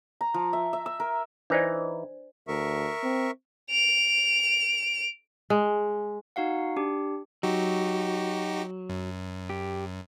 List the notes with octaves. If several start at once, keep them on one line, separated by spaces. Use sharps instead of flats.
A#5
F3
E5
E5
E6
A#4
E3 D4 D#4 C5 D5
D2 A#4 E5 C#6
C4
D7 F7
G#3
D#4 F#4 F5 F#5
D4 G4
F#3 D#4 F#4 G4
F#2
G4